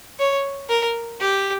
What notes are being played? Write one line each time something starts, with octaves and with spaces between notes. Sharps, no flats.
C#5
A#4
G4